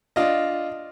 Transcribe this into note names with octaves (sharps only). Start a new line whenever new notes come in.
D4 F4 D#5